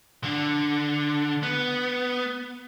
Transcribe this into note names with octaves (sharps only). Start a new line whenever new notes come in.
D3
B3